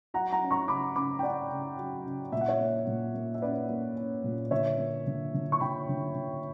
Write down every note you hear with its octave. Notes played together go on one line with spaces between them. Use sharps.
F#3 F#5 A#5
F#5 A#5
C#4
A#5 C#6
C#3 B5 D6
C#3 B5 D6
G5
C#4 D5 F#5
C#3
F#3
C#3
A#2 E5
F#5
C#5 E5
A#3
A#2
A#3
E5
C#4 B4 D5
A#3
C#4
A#2
D3 C#5 E5
A#3
D3
D3
C#6
D3 G5 B5
D3
D3